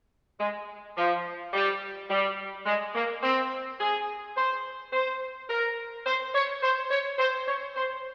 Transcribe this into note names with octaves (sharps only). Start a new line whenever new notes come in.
G#3
F3
G3
G3
G#3
A#3
C4
G#4
C5
C5
A#4
C5
C#5
C5
C#5
C5
C#5
C5